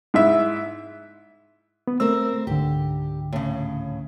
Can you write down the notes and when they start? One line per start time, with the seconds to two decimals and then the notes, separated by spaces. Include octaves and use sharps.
0.14 G#2 E4 E5
1.87 B3
2.00 A3 C4 A#4 E6
2.47 C#2 G#2 D3 G4
3.33 A2 C#3